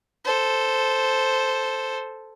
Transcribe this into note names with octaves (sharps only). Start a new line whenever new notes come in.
A4 C5